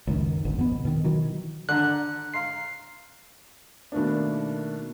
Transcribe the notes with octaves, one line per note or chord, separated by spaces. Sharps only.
C#2 F#2 D#3
G#1 D2
F2 B2 B3
B2 D#3
D#3 E3 F#3
D3 A#5 F#6
F5 A#5 C6 C7
B2 D#3 A3 A#3 D4